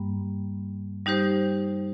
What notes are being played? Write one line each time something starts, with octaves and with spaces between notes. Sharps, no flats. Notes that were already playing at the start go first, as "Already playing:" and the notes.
Already playing: G2 G3 A#3
G3 D#4 G4 C5